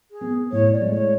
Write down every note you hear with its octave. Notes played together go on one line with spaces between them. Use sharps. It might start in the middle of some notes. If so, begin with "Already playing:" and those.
G#4
B3
A2 C#5
D5
G#3
C#5